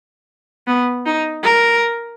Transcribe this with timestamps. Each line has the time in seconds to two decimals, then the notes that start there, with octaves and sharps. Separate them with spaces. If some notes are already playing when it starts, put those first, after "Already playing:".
0.67 B3
1.06 D#4
1.43 A#4